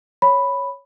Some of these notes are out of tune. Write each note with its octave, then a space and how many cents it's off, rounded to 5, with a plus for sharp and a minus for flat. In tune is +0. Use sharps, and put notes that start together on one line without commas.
C#5 +0 B5 +0